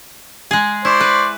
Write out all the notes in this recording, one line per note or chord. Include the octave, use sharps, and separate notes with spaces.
G#3 G#4
E4 C5 D5 C#6
B4